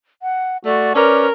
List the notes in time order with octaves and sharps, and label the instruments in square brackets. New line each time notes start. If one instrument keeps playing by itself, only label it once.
[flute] F#5
[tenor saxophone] A3 [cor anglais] F#4 [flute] D5
[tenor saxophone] C#4 [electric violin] A#4 [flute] B4 [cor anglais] D5